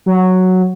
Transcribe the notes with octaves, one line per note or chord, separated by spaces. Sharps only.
F#3